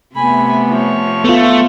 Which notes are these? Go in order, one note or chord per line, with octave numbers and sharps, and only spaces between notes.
C3 A3 B3 G#5 B5
F3 C#5
A3 B3 F4